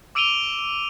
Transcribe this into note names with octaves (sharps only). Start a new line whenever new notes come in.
D6 E6 D7 D#7 F7 G7